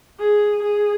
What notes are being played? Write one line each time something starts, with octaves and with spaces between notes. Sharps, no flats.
G#4
G#4